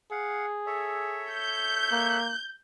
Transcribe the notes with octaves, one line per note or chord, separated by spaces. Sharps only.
G#4 F5 F#5
A4 C#5 E5
G6
A#3